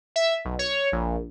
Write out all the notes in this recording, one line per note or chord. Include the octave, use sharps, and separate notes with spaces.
E5
B1
C#5
A#1